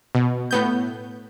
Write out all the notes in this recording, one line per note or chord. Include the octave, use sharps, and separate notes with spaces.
B2
A2 B3 G6